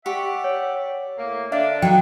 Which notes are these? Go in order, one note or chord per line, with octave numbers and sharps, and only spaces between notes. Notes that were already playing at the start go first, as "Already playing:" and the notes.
G4 D5 E5 F#5 C#6
C#5
A2 A#3
D3 D4 E5 F5 A5
F#3 D#4 F5 G5